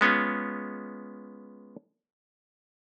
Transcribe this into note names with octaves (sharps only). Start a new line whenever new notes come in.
G#3 B3 C#4 F4